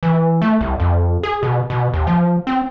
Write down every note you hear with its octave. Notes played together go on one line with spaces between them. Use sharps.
E3
A3
C2
F2
G#4
B2
B2
D#2
F3
C4